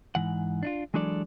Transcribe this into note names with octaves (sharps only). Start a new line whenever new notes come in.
G#2 E3 F#5
D4 D#4 F4
E3 F#3 G#3 D4 A4 D5